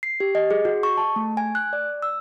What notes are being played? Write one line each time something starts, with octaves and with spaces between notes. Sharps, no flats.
C7
G4
D#5
G#4
F#4
C#6
A5
A3
G#5
F#6
D5
E6